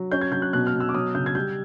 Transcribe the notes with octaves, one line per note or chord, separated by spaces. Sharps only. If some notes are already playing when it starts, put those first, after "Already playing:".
Already playing: F#3
C#4 G6
G#6
F#3 G6
F#6
B2 F#6
F6
B2
E6
D6
F#3 D#6
C#3 G6
G#6
G3 G6